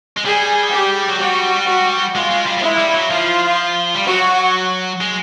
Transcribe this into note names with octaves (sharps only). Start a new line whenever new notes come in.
G#3
G3 G#4
G4
F#3
G3 F#4
F#4
G#3 F4
G#3
G3
G3
G#3 E4
G3
F#3
F3 F4
G3
F#3 F#4
G#3